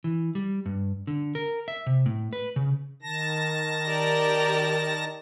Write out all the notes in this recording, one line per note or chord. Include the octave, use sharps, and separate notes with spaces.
E3
G3
G2
D3
A#4
E5
C3
A2
B4
C#3
D#3 A5 A#6
G4 A#4 D5